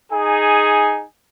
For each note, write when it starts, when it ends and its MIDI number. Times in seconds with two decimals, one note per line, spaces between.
0.12 1.04 63
0.12 1.04 68
0.12 1.04 80